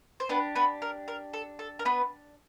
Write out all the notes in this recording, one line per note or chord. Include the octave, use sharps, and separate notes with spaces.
C5
B3 D4 G4 B4
B3 B4
A#4
A#4
A4
A4
A#4
B3 B4